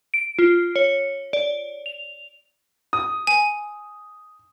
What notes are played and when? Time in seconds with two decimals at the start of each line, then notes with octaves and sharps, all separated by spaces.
0.14 D7
0.39 F4
0.76 C#5
1.33 D5
1.86 F7
2.93 D#6
3.27 G#5